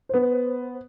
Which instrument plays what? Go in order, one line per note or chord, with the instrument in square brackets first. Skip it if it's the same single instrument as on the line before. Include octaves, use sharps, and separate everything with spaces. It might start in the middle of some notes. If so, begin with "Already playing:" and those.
[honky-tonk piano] B3 C5